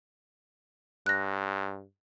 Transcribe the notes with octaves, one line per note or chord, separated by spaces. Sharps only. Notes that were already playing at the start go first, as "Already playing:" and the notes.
G2 F#6 A#6